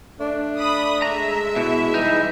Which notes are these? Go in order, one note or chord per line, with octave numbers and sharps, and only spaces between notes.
A3 D4
B5 D#6
G#3 E5 A#5
B2 E4
E3 G3 D#4